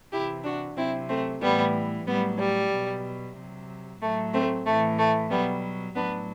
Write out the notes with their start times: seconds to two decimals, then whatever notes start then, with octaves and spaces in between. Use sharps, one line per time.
0.11 C3 E3 E4 G4
0.44 D4 F#4
0.76 C3 F#3 C4 E4
1.08 A3 C4
1.41 A2 E3 G3 B3
2.06 A2 F#3 G3 B3
2.39 G3
2.71 B2 F#3
3.36 C3 F#3
4.01 A2 F#3 A3
4.32 A3 C4
4.65 A2 E3 A3
4.98 A3
5.30 B2 F#3 G3 B3
5.95 A2 F#3 B3 D4